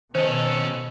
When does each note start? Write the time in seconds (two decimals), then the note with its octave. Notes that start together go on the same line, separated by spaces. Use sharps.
0.15 B2 D#3 C#4 A4 C5 D#5